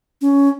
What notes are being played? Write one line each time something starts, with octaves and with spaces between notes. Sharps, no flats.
C#4